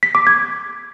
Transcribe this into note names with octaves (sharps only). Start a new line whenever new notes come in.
B6
D6
G#6